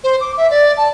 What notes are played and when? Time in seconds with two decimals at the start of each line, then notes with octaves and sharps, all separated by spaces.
0.04 C5
0.21 D6
0.37 E5
0.51 D5
0.77 A5